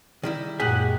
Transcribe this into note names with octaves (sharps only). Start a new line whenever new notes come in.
D#3 G3 E4
F#2 A#2 G#3 G4 G#4 F#5